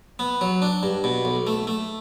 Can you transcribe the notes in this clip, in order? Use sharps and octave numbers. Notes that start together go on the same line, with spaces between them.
B3
F#3
D4
G2
B2
B1
A3
A3